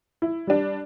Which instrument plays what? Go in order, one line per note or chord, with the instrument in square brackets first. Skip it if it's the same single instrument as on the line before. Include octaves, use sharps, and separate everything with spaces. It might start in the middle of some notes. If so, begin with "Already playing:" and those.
[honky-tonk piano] E4
G3 D4